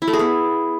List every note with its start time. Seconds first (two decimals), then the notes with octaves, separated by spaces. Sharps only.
0.02 E4
0.08 A3
0.13 G#4
0.19 B3